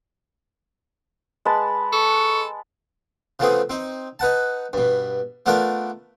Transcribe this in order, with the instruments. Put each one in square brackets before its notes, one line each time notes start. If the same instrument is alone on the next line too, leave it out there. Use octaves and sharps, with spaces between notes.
[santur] G#3 B4 A5
[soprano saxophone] A4 [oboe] C#6
[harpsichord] C#3 F3 A3 B3 C4 G#4
C4 D#4
D#4 B4 F#5 A5
G2 B2
A3 B3 D4 F4 A#4 A5